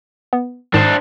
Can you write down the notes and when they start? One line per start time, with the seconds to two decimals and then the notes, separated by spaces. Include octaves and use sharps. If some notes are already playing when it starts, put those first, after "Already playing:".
0.33 B3
0.74 G#2 D#3 D4 C5